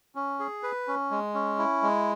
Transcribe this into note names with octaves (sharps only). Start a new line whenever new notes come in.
C#4
G#4
B4
C#4
G#3
C#4
E4
G#3